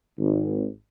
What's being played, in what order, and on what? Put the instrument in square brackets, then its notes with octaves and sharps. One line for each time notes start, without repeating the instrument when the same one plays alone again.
[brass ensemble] G#1